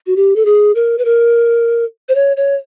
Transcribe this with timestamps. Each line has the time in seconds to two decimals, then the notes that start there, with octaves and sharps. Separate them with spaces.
0.06 F#4
0.16 G4
0.36 A4
0.45 G#4
0.75 A#4
0.98 B4
1.05 A#4
2.09 C5
2.15 C#5
2.37 C#5